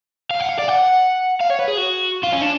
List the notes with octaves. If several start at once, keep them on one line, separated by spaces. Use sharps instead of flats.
F5
F#5
F5
D5
F#5
F5
C#5
B4
G#4
F#4
F4
C#4
D4